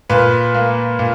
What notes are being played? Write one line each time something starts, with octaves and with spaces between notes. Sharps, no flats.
A#2 B4
A#3
A#2